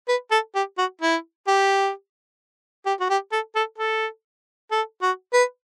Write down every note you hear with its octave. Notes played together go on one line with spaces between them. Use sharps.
B4
A4
G4
F#4
E4
G4
G4
F#4
G4
A4
A4
A4
A4
F#4
B4